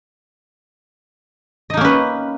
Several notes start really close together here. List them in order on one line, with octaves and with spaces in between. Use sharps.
D#5 D#4 A#3 C#4 B4